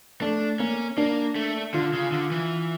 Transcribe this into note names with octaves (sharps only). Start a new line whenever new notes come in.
A3 D4
A#3 C#4
A#3 D4
A3
D3 F4
C#3
D3
E3